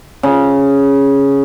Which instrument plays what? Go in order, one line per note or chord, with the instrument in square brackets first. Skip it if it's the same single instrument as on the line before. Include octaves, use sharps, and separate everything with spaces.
[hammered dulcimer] C#3